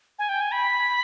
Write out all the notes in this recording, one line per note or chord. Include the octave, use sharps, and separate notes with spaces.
G#5
G5
G#5
B5